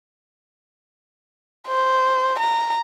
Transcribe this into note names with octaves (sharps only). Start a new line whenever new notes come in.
C5
A#5